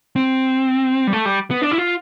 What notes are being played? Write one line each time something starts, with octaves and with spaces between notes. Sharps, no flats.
C4
G3
A3
G3
B3
D4
E4
F4